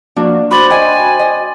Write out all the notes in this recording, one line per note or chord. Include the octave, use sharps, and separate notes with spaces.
F3 A#3 D4 F#4
F#4 C5 B5 C6 D6 A6
D#5 G5 G#5
D#5